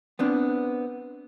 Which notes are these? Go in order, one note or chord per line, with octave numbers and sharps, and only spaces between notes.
B3 C4 D4